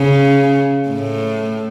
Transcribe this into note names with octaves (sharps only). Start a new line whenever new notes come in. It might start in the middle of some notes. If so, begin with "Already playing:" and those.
Already playing: C#3
A2